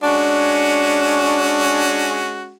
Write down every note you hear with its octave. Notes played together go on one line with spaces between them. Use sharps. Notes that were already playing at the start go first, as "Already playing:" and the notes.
G#3 C#4 D4 F#4